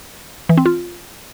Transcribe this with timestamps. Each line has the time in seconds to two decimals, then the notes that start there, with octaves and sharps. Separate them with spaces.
0.49 E3
0.57 C4
0.66 F4